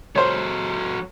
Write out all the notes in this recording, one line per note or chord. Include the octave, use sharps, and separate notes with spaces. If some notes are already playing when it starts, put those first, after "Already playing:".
F#3 A4 C5 C#5